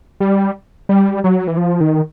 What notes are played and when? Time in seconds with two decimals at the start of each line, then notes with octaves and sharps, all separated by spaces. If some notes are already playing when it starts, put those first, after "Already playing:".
0.20 G3
0.89 G3
1.24 F#3
1.47 E3
1.57 F3
1.81 D#3